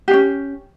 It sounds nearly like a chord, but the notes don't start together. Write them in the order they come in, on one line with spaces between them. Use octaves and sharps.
G4 D4 C#4